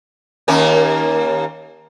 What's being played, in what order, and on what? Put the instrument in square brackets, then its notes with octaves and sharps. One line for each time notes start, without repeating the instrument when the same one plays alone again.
[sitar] D#2 A#3 C#4